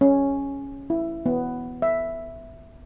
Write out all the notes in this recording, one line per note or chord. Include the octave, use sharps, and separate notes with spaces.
C#4
E4
B3
E5